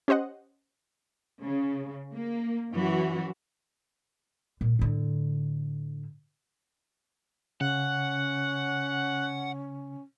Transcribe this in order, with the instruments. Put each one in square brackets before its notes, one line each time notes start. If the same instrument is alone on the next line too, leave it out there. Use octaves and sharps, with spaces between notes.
[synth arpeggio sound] C#4 G4 C5 D#5 F#5
[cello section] C#3
A#3
F#2 E3 F#4
[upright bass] A#2
A2 D3
[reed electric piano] C#3 [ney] C#4 [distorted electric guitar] F#5 [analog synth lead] F#6